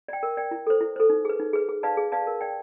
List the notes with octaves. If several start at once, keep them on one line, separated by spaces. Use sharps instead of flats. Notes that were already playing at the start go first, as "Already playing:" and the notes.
D5 G5
A#4
D5 G5
E4
A4 C5
E4
A4 C5
D#4
G#4 B4
D#4
G#4 B4
G#4
B4 D5 F5 A5
G#4
B4 D5 F5 A5
A#4
D5 G5